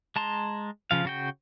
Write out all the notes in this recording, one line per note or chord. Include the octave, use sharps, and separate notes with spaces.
G#3 A5 A#5 C6
C#3 F3 F5
C#3 F#4 G5